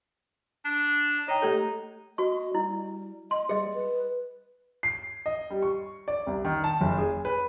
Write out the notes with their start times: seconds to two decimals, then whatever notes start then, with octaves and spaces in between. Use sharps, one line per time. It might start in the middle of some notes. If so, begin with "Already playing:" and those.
0.65 D4
1.28 D#4 C#5 G5
1.42 A3 G4 A4
2.18 F#4 D#5 C#6
2.55 G3 E4
3.31 D#5 C6
3.49 G3 G#4 D#5
3.74 B4
4.83 C7
5.26 D#5
5.50 G3
5.62 C#6
6.08 D5
6.27 C2
6.45 D#3
6.64 A5
6.81 F#1
6.98 G#4
7.25 B4